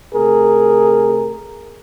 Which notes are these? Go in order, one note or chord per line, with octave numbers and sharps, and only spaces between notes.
C3 A3 G#4 A#4